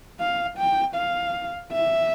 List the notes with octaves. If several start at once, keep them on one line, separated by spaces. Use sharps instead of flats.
F5
G5
F5
E5